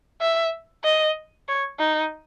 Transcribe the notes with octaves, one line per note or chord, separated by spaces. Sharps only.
E5
D#5
C#5
D#4